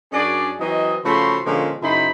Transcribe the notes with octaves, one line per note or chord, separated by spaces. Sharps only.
F#2 C#4 D4 F#4 G#4 D5
E3 F#3 C4 D#5
C#3 F3 A3 F#4 B5 C6
A#2 D3 F3 G#3 C#4
F#2 C#3 D#4 E4 C5 B5